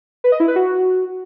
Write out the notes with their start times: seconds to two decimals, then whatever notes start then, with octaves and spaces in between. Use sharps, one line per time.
0.24 B4
0.32 D#5
0.40 E4
0.48 B4
0.56 F#4